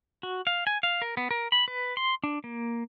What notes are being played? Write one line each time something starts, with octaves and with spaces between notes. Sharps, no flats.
F#4
F5
G#5
F5
A#4
B3
A#4
B5
B4
C6
D4
A#3